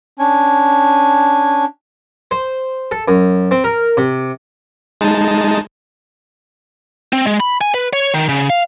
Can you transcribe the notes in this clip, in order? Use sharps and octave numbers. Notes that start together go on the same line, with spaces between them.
C#4 D4 G#5
C5
A4
F#2
C4
A#4
C3
G#3 D#4 A5
C4
G#3
B5
G#5
B4
C#5
D#3
C#3
F5